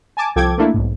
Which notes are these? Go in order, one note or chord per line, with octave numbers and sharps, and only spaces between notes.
G#5 A5 D6
C2 F3 A4 G5 D6 G#6
A3 A#3 D4 E4
B1 G#2